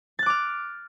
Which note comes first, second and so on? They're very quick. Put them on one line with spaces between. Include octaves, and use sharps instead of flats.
A6 F#6 D6 F6